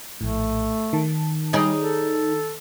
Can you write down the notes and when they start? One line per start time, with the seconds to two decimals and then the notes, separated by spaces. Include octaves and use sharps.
0.21 A#1 A2 A3
0.93 D#3 A5
1.53 G3 D#4 G#4 D5
1.80 A4